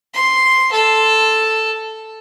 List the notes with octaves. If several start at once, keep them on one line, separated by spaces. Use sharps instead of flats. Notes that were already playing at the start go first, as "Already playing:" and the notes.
C6
A4